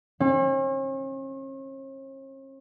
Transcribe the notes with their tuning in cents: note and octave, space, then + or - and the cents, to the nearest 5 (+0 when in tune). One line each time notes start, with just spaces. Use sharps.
C#4 -45